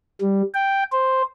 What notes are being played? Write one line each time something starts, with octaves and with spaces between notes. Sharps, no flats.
G3
G5
C5